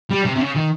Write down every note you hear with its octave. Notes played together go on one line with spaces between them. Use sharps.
G3
C3
C3
C#3
D#3